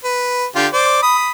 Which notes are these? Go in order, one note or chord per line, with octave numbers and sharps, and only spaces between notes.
B4
D3 F4 G4
C5 D5
B5 D#6